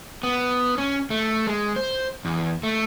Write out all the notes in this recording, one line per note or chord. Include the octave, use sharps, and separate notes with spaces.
B3
C#4
A3
G#3
C5
E2
A3